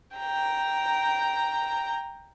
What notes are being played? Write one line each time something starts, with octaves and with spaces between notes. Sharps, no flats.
G5 A#5